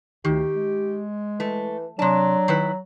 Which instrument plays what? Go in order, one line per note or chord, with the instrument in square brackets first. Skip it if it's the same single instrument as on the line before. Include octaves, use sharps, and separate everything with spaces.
[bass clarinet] D2 [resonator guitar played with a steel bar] D#3 [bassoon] G4
[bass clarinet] G#3
[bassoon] E3 [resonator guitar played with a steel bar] A3
[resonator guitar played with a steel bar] C3 A5 [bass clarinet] F#3 [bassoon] D4
[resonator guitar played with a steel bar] D#3 E4 B4